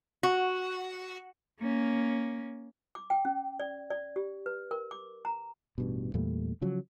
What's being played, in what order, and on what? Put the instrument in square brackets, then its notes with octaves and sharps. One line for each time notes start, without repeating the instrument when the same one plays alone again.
[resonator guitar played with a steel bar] F#4
[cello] A#3 C#4
[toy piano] D6
G5
C#4
D5
D5
G4
B4
A#4
D6
A#5
[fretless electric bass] A1 G2 B2
E2 A#2 G3 A3
C#3 F3 F#3